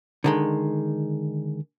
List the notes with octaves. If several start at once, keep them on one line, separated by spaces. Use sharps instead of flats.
D3 D#3 G#3